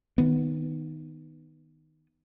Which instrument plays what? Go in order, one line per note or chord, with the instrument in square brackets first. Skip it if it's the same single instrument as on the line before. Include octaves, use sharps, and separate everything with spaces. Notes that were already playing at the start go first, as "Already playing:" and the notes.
[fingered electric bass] D#3 B3